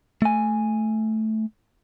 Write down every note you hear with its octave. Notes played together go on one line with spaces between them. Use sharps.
A3 G#5